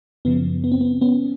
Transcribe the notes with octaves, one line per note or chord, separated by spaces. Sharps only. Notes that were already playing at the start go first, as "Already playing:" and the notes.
F#2 C#3 F3 B3
B3
C4
B3
B3 C#4